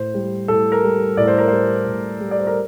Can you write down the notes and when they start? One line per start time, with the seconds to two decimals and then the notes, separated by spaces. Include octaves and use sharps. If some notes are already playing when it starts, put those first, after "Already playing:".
Already playing: A2 C5
0.14 G3
0.48 A2 A4
0.72 A#4
0.83 G3
1.17 A2 D5
1.27 C5
1.38 A#4
1.48 G3 C5
1.86 A2
2.20 G3
2.31 D5
2.39 C5
2.47 A#4